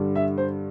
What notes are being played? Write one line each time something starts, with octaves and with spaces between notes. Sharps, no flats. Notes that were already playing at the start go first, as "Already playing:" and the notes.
Already playing: G2 D3 G3
E5
C5